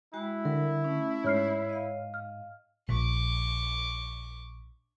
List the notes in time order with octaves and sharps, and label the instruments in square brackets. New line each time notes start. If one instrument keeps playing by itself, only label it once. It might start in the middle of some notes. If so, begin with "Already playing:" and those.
[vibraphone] G#3 F#4 G5 [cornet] E4
[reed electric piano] D3 [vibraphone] G3 A#4
[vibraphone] A3 C#4
[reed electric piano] G#2 [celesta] C#5 F6 C7
[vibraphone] D#5 F5
[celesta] F6
[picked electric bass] A#1 [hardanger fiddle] C#6 D6